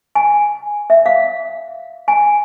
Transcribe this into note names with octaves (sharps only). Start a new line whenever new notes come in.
G#5
E5
F5
G#5